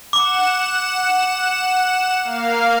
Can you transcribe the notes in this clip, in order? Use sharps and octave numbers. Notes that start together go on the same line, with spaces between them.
F#5 D6 E7
A#3 F5